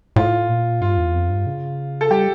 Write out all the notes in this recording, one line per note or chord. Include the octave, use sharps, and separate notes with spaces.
A2 F4
A#2
G2 F4
E2
F2
G2
C#3
A4
G3 G4